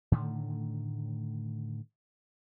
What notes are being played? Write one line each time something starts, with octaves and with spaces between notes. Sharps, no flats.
A2 D3 D#3 A3